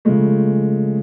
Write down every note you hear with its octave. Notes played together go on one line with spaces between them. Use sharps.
C#3 F3 G#3 A3